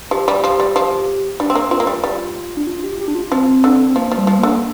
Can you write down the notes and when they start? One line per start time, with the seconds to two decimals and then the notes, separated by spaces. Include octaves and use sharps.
0.11 F3 G4
0.28 G3
0.44 F3
0.60 G3
0.76 F3
1.40 G3 D4
1.50 C4
1.55 A#3
1.71 C4 F4
1.80 A#3
1.87 G3
2.04 G3
2.57 D4
2.67 F4
2.84 G4
3.00 G4
3.08 D4
3.15 F4
3.32 F3 C4
3.64 D3
3.89 C4
3.96 F3 A#3
4.12 F3
4.17 G3
4.27 F3
4.39 D3 A#3